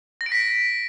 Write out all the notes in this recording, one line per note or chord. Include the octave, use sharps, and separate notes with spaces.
A#6
D7
B6